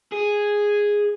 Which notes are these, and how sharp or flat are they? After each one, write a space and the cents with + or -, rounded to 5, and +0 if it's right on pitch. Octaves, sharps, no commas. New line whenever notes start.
G#4 -5